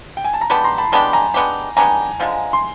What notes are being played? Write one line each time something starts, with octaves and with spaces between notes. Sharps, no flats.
G5
G#5
A5
A#5
G#3 B3 D4 G4 A5 B5
A#5 C6
A5 B5
G#3 B3 D4 G4 A5 B5
G#5 A#5
G#3 B3 D4 G4
G#3 B3 D4 G4 G#5 A#5
D3 F3 G#3
C6